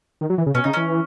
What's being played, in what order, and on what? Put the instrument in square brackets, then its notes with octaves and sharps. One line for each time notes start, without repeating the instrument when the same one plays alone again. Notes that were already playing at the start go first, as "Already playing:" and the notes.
[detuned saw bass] D#3
F#3
E3
C#3
[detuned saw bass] B2 [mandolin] C#4
[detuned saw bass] C#3 [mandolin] D#4
[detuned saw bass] E3 [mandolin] C#4